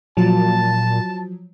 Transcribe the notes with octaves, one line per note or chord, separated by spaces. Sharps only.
A#2 F3 F#3 A5